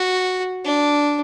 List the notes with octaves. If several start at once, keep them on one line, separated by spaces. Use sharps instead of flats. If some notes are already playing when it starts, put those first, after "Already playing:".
Already playing: F#4
D4